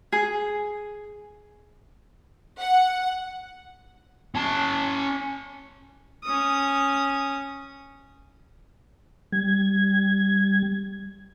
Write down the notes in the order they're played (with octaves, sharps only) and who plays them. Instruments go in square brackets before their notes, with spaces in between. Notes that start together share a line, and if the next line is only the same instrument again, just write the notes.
[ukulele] G#4
[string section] F#5
[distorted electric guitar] C#4 A5
[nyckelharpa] C#4 D#6
[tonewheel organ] G3 G#6